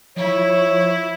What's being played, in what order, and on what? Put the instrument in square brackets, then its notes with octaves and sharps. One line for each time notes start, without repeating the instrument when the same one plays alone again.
[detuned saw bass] F3 [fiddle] E4 [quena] C#5